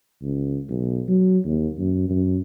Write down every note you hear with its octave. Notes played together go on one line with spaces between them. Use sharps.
C#2
B1
F#3
D#2
F#2
F#2